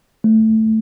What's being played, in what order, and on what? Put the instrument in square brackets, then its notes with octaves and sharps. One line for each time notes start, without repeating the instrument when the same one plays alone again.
[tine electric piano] A3